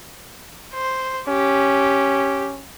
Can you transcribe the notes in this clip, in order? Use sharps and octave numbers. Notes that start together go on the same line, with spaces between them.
C5
C#4 G4